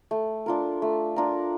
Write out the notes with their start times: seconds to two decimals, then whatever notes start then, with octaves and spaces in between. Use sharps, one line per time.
0.11 A3
0.46 D4 F4 A#4
0.82 A3
1.16 D4 F4 A#4